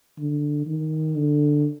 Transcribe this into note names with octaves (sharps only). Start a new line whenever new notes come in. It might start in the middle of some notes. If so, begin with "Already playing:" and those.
D3
D#3
D3